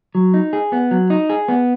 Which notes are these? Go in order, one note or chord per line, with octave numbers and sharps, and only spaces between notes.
F#3
D#4
G#4
B3
F#3
D#4
G#4
B3